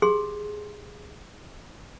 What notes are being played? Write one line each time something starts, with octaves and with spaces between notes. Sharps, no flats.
G4 G#4 C6